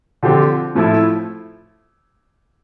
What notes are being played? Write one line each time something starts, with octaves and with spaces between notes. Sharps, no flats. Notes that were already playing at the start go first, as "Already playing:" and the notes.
D3 F3 C4 G4
A2 F3 A3 E4